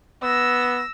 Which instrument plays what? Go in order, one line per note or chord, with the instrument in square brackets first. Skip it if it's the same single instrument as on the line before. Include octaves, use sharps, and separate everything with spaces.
[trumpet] B3 [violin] E6 A#6